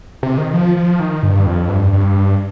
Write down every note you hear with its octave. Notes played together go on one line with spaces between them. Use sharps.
C3
D#3
F3
F3
D#3
G2
F2
G2
G2